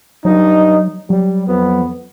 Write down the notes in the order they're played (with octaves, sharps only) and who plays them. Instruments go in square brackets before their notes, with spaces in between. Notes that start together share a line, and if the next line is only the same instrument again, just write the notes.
[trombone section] G2 D#4 [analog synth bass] F#3
[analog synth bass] F#3 [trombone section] G3
[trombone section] F2 B3